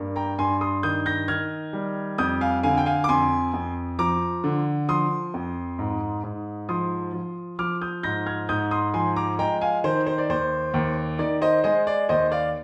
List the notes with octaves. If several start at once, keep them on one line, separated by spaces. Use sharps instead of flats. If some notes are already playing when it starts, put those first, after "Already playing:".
Already playing: G2 A#3
G5 A#5
G2 G#5 C6
C6 D#6
D#3 D#6 G6
G6 A#6
D#3 F6 G#6
G3
F2 D#6 G6
F5 G#5
D3 F5 G#5
G5
F5 G#5
D6
F2 G#5 C6
F2
F3 A#5 D6
D3
F3 C6 D#6
F2
G#2
G#2
F3 C6 D#6
F3
F3 D6 F6
D#6 G6
G#2 G6 A#6
F6 G#6
G#2 D#6 G6
C6 D#6
F3 G#5 C6
A#5 D6
G#3 G5 A#5
F5 G#5
D#3 C5
C5
D5
D#2 C5
D#2
D#3 D5
C5 D#5
G#3 C5 D#5
D5
D#2 C5 D#5
D5 F5